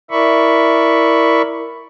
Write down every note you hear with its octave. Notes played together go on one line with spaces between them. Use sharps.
E4 A#4 D5 E5 B5 C#6